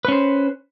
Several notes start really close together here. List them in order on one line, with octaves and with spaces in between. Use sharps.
B4 C#4 C5